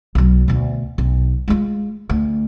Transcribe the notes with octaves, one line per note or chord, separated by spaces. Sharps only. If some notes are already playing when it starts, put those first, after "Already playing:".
B1 F#3
D2 B2
B1
G#3 F4
D2